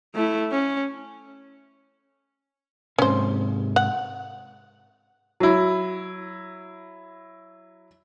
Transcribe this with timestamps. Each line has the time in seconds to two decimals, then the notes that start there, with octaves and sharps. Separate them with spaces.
0.15 A3 E4
0.52 C#4
2.98 G#2 C3 C#4 C5
3.76 F#5
5.40 F#3 E4